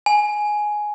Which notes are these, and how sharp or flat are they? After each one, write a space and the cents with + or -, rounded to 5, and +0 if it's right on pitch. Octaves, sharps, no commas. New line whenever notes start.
G#5 +10